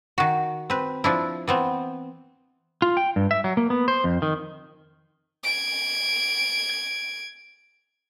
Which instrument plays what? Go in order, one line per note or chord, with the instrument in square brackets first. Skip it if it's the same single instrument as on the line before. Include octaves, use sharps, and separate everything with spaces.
[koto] D#3 F#4
C4 B4
F3 D4 E4
E3 B3 C4
[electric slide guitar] F4
G5
G2
E5
F#3
A#3
B3
C5
F2
D#3
[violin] G#6 D7